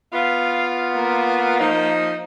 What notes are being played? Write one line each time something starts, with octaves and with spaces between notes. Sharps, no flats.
B3 F4 F5
A#3
F3 D#4